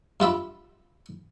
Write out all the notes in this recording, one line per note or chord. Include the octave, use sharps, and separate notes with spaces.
G2 F4 E5 B5